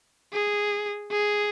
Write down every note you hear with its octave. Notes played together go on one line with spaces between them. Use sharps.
G#4
G#4